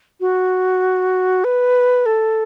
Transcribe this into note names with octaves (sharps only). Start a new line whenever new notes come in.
F#4
B4
A4